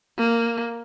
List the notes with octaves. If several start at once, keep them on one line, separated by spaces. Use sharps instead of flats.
A#3